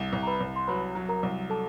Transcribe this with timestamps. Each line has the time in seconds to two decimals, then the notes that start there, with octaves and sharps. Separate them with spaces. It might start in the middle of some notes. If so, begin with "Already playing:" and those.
Already playing: C2
0.13 C2
0.23 A#5
0.27 B4 B5
0.40 C2
0.56 C6
0.68 F#3 B4 B5
0.95 F#3
1.09 A#4 A#5
1.23 C2
1.50 A4 A5